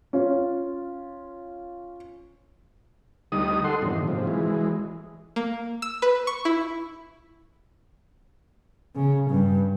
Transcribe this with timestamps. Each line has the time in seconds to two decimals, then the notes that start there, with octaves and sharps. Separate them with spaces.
0.13 C#4 F4
3.32 D2 G3 D#4 D#6
3.64 A4 F#5 C6
3.82 E2 G2 A#2 D3 D#3
4.08 G#2 C3 F3
4.27 E3 G#3
5.36 A#3
5.82 E6
6.02 B4
6.27 C#6
6.45 E4
8.95 C#3
9.30 G2